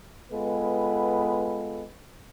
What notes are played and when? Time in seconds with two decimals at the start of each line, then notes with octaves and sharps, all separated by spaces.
0.32 G#3 B3 F4 A4 B4